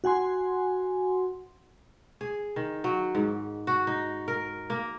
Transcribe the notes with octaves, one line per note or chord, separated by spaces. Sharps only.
F#4 F#5 G#5 C6
G#4
D#3
F#3
G#2
F#4
D#4
A#4
A#3